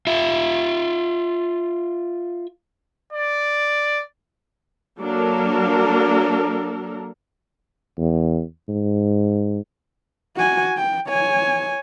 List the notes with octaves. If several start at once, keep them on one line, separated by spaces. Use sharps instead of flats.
F4 E5
D5
F#3 A#3 D4 A4 A#4
E2
G#2
F#4 G#5
G5
C#5 G#5